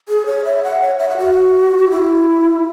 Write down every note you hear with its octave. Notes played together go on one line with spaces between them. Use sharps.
G#4
C#5
E5
F#5
C#5
E5
F#5
F#4
E4